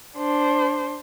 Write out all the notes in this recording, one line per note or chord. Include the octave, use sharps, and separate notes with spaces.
D4 C5